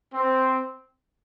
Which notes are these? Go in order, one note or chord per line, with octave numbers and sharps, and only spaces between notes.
C4